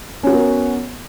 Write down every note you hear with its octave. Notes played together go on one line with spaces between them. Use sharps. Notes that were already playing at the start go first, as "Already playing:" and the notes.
B3 C#4 F#4 A#4